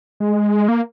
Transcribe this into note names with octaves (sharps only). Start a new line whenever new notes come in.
G#3
A#3